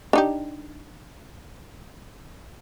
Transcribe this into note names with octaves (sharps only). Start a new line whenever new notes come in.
D4 D#4 G4